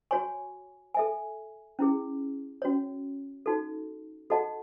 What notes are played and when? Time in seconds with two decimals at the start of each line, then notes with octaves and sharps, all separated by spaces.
0.11 F#4 C#5 G#5 C#6
0.94 A4 E5 G#5
1.79 C#4 E4 G#4
2.62 C#4 F#4 C#5
3.46 D#4 F#4 A4
4.30 F#4 A4 D#5 F#5 A5